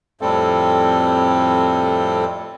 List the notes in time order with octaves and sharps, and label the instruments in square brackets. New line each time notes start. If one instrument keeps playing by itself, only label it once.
[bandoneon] F2 A2 G3 C4 A4